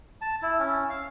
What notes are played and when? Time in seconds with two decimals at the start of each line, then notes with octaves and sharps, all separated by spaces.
0.21 A5
0.42 E4
0.59 C#4
0.90 F5